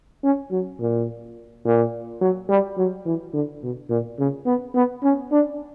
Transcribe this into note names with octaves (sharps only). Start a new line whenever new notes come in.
C#4
F#3
A#2
A#2
F#3
G3
F#3
E3
D3
B2
A#2
C#3
B3
B3
C#4
D4